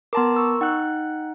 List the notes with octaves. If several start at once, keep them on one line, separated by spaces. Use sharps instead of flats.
B3 A#4 A5 A#5 C6 D6
C#6 E6
D#4 F#5 G5 F#6